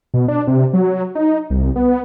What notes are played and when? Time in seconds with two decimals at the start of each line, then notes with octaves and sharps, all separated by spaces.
0.14 B2
0.28 D4
0.47 C3
0.73 F#3
1.15 D#4
1.50 C2
1.76 B3